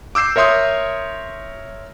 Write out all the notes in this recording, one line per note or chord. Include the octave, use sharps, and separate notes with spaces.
D6 E6 G6 C7 E7
A#4 C#5 E5 C6 D#6 G6